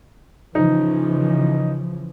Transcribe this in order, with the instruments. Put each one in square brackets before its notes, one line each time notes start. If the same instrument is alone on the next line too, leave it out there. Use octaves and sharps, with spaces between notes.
[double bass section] C#3 E3 F3 [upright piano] D#4